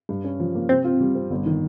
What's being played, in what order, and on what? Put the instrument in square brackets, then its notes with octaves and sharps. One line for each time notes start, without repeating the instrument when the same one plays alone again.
[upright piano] G2
C#4
F3
A#3
[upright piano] C3 [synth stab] C4
[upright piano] F4
G3
C4
G1
D#3